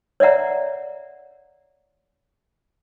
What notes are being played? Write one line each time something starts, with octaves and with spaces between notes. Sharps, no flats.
C#5 D5 E5 F#5 A#5